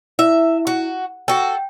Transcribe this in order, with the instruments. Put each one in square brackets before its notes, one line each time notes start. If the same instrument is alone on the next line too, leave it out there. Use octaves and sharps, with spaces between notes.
[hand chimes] E4 [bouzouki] E5
[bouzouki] F#4
[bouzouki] F#4 A4 [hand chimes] G5